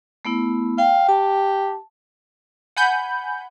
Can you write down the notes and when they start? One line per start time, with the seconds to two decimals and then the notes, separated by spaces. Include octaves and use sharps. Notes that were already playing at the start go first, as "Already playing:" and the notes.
0.25 A3 B3 E4
0.78 F5 G5
1.09 G4 A5
2.77 F#5 G#5 B5 G6